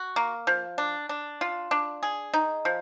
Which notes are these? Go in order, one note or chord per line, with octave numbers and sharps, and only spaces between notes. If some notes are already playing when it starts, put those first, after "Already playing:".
Already playing: F#4
A#3
F3
D4
D4
F4
D4
G#4
D#4
F3